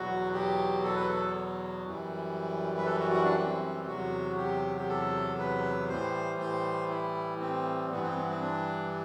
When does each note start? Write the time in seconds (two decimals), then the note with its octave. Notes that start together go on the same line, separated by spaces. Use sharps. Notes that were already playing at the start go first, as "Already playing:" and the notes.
Already playing: E2 B2 F#3 F#4
0.34 G4
0.84 A4
0.96 B4
1.09 A4
1.85 F#2 E3 G3
2.78 B4
2.86 A4
2.99 F#4
3.11 F#4
3.24 D4
3.36 C4
3.87 E2 C3 F#3 F#4
4.37 G4
4.77 G4
4.88 A4
5.39 B4
5.89 A2 E3 G3 C5
6.40 C5
6.89 E4
7.40 C4
7.90 G2 E3 G3 B3
8.03 C4
8.16 B3
8.29 C4
8.41 D4